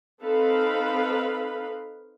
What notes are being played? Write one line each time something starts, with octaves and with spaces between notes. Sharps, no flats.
C4 D#4 A4 B4 F5 B5